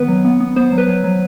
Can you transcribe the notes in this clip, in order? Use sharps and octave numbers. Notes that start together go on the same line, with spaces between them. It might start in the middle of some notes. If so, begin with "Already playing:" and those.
Already playing: D#3 B3 B4
F#3
B3
B3
B3 C5
F#3
B4
F#3
F#3